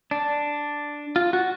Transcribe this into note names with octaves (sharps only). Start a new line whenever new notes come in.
D4
F4
F#4